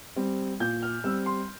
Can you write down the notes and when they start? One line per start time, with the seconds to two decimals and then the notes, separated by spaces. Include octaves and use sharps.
0.16 G3 C4
0.60 A#2 G6
0.82 F6
1.04 G3 C4 E6
1.26 C6